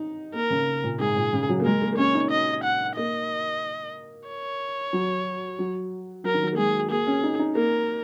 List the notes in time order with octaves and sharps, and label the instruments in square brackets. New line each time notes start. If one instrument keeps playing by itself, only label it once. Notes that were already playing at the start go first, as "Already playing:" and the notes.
Already playing: [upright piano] D#4
[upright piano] A#3 [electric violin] A#4
[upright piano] C#3
A#2
[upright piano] G#2 [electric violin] G#4
[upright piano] A#2
C#3
F#3
A#3
[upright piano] G#3 [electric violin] A#4
[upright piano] A#3
A#3
[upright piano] C#4 [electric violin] C#5
[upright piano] D#4
[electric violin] D#5
F#5
[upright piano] A#3 [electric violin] D#5
[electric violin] C#5
[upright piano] F#3
F#3
[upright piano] F#3 [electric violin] A#4
[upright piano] D#3
F#3
A#3
[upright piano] G#3 [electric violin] G#4
[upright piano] A#3 [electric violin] G#4
[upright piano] C#4
D#4
D#4
[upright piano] A#3 [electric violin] A#4